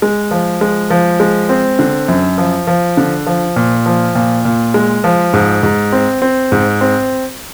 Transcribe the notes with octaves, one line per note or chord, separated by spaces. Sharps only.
G#3
F3
G#3
F3
G#3
C4
D3
F#2
F3
F3
D3
F3
A#2
F3
A#2
A#2
G#3
F3
G#2
G#2
C4
C4
G#2
C4